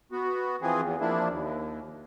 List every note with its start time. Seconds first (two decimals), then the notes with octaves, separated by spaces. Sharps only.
0.12 B3 F#4
0.62 E3 F3 C4 G#4
0.82 E2
1.01 F3 A#3 D4 E4
1.29 D#2